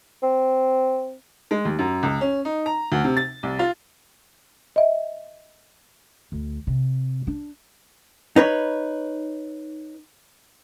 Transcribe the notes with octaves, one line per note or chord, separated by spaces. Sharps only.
C4
G#3
D#2
F#2
C#2
C#4
D#4
A#5
D2
C3
A6
C2
F4
D#5 E5
D2
C3
D4
D#4 B4 C#5